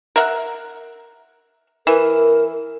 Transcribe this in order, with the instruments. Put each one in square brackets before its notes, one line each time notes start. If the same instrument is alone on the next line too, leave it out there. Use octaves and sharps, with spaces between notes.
[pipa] A#4 E5 F#5
[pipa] E3 [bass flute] A#4